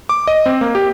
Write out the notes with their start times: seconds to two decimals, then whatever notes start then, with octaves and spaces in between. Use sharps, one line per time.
0.09 D6
0.27 D#5
0.46 C4
0.61 A#3
0.75 G4